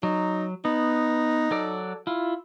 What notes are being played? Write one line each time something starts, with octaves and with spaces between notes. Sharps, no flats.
F#3 D#4
B3 D#4
F#3 A4 D5
E4 F4